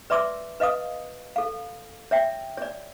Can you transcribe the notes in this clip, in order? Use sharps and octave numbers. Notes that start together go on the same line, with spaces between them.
B4 D5 E5 C6 D6 E6
B4 D#5 F5 D#6
A4 F5
C#5 E5 G5
C#5 D5